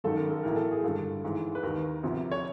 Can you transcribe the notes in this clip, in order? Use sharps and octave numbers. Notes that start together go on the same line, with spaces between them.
G#1 F#2 D#3 A4
A#4
A4
B1 A2 E3 A#4
A4
G#4
G#1 G2 D3 A4
G#1 G#2 E3
B4
D#2 D#3 A#4
D2 C3 F3
C#5